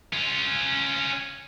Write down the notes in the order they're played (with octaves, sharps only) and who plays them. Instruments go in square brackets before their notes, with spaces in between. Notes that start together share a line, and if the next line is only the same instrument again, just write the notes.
[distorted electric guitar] C#4 F4